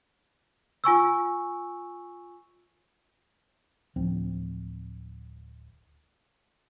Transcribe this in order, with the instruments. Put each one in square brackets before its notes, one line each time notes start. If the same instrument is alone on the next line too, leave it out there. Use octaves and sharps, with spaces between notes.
[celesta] F4 G#5 C#6 E6
[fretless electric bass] D1 F3 C4